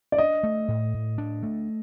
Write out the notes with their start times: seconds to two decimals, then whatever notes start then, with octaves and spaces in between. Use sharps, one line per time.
0.12 D5
0.18 D4 D#5
0.43 A3
0.68 A2
0.94 A2
1.18 D4
1.43 A3